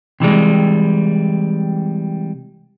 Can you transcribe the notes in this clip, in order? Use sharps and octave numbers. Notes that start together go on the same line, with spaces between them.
C3 E3 G3 G#3